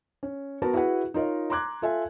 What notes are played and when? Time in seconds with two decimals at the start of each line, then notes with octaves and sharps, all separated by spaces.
0.23 C#4
0.62 B3 F#4 A#4 B4 A5
0.74 E4 F#4 G#4 B4 F#5
1.14 D#4 F4 A#4 C#5 D#5
1.50 A#5 C6 D6 F#6 G#6
1.82 F4 A4 E5 G#5